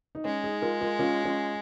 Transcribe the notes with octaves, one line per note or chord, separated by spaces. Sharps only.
D#4
G#3 C#4
D#4 G#4
F4 A#4
F4 A#4
C#4 F4
C#4 F4